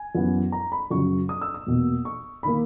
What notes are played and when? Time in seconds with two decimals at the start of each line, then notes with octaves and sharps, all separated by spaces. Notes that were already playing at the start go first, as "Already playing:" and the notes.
Already playing: G#5
0.15 F#2 E3 B3
0.52 A#5
0.72 B5
0.91 F#2 C#3 F#3 C#6
1.29 D#6
1.41 E6
1.54 D#6
1.67 E2 B2 A#3
2.05 C#6
2.43 D#3 A#3 B5